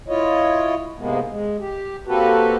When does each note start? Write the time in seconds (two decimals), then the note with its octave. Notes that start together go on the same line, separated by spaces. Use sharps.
0.08 E4 F4 C#5 D#5
0.98 G#2 C3 G#3 A#3 B3
1.29 G#3
1.60 G4
2.07 A#3 C4 F#4 G4 A4 B4